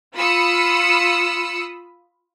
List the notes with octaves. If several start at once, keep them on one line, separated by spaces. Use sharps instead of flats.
F4 B5 D#6 E6 C#7